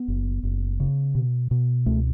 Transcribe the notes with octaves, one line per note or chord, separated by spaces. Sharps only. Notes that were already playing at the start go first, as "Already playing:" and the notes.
Already playing: B3
F#1
F#1
C#3
B2
B2
C#2 A3